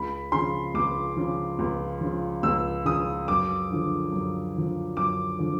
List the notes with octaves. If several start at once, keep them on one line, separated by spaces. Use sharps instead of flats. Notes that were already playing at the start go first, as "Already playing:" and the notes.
Already playing: C#2 B5
C#3 F3 C6
C#2 D6
C#3 F3
C#2
C#3 F3
C#2 E6
C#3 F3 D#6
F#2 D6
D3 F3
F#2
D3 F3
F#2 D6
D3 F3